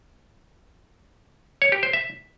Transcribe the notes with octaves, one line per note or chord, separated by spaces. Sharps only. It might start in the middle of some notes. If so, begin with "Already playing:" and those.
C#5
G4
C5
E5